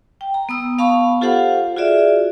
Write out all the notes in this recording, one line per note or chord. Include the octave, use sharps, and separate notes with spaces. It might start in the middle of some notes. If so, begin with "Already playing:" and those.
G5
A#5
B3 D#6 E6
B3 F5 A5 B5 C#6
F4 G4 A4 C5 F5 F#5
F4 F#4 G#4 D5 E5